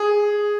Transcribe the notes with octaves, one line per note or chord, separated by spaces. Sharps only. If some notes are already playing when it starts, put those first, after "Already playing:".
Already playing: G#4